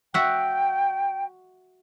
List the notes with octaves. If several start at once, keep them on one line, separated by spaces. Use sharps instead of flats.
F#4 E5 F#5 G5